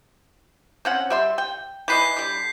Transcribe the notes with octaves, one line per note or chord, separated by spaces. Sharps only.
C4 C#4 F#5
G3 E5 C6
G5
E3 B4 D#5 G6 B6 C7
D3 G3